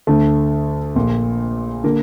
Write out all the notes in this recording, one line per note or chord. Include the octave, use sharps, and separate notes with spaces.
D2 D3 A3
A#1 A#2
D3 A#3